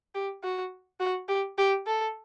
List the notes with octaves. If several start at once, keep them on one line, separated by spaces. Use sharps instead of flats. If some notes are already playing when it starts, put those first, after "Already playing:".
G4
F#4
F#4
G4
G4
A4